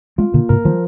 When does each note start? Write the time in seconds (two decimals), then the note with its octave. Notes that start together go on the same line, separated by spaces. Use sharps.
0.18 G#3 C4 F4
0.34 A#2 D3 A#3
0.49 G#2 C3 A#4
0.65 D#3 F3 G3